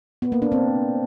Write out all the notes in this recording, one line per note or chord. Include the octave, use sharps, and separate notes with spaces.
B3
A#3
D4
C4